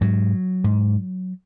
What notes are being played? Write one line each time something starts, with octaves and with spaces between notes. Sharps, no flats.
G#2 F#3
G#2